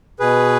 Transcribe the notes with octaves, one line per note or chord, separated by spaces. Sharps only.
B2 G#4 B4